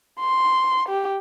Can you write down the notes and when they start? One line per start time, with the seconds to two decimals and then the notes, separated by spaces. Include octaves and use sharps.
0.20 C6
0.89 G4